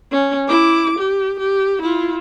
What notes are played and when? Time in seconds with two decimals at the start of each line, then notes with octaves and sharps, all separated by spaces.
0.12 C#4
0.49 E4 D6
0.99 G4
1.39 G4
1.82 E4 F4